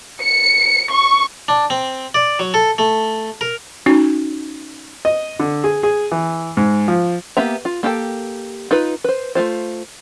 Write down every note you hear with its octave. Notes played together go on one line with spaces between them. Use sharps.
C#7
C#6
D4
C4
D5
F#3
A4
A3
A#4
C#4 D#4 F#4
D#5
D3
G#4
G#4
E3
G#2
F3
A#3 B3 G4 E5 A#5
F4
A#3 G4 A4 G5 A5
D#4 F4 B4
B4 C5
A3 C4 F4 C5